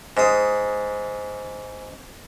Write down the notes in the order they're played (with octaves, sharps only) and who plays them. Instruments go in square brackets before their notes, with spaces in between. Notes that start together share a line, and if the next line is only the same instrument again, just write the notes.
[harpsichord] G#2 D#6